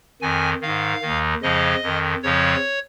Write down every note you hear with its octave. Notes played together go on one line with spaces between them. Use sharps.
F2 D#3 G#5
G#2 D#3 F5
D#2 D#3
F2 C#3 F3 D#5
F2 D#3
F2 C#3 F3 C#5